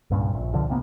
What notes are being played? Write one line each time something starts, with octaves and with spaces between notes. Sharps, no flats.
C2 G2 A#2 C#3
A#1
C#2 B2 D3 F3
C2 C3 A#3 B3